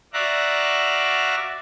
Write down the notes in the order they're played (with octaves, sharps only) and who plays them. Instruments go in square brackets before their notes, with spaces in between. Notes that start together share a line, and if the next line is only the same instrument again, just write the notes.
[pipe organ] F#4 D5 E5 F5 A#5 F#6